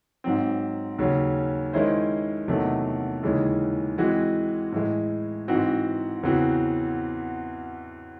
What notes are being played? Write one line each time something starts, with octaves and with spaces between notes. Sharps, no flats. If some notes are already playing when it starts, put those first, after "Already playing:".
G#2 F#3 C4
D#2 C#3 F#3 C#4
D#3 G#3 C#4 E4 C5
E2 C3 D#3 F#3 A3
D#2 C#3 E3 G#3 C#4
E3 G#3 C4 F#4
A2 E3 G#3
G#2 E3 C4 F#4
E2 C#3 E3 C4 F#4